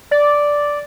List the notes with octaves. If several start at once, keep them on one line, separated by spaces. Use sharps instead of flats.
D5